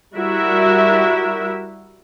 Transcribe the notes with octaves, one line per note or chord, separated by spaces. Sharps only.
G3 E4 F#4 A#4 E5